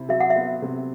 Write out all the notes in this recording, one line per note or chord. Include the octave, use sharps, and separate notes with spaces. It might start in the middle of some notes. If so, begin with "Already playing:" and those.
Already playing: C3 E4
F#3 E5
F#5
E5
B3
C3